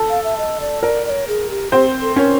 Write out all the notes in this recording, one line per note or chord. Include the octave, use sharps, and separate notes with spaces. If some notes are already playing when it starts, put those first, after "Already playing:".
Already playing: A4
F5
E5
D#5
D5
A#4 D5
D5
C#5
G#4
G4
C4 G4 C5
A4
C#4 A#4 C#5